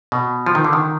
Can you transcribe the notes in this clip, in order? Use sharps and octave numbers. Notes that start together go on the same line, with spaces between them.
B2
F3
D#3
D3
D#3